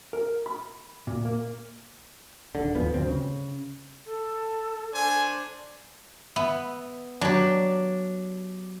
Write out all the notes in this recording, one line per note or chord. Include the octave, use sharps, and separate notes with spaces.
A#4
B5
A#2
A#3
D#1 G#1 D3
G#1 D#2 F3 B3
D1 G1 D2 C4
C#3
A4
D4 C5 G#5
B3 E5
F#3 D4 G4